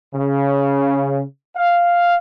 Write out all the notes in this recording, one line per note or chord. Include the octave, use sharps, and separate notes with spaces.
C#3
F5